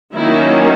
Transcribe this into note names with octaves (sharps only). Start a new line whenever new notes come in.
D#3 F#3 A#3 C#4 E4